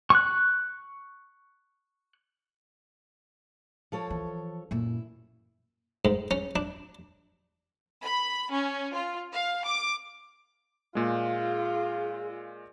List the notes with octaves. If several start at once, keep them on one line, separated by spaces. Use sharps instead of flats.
C#6 F#6
F3 A4 C#5
E3
F#2 A#2 E4
G#2
C#4
D4
B5
C#4
F4
F5
D6
A#2 G#3 F4 G#4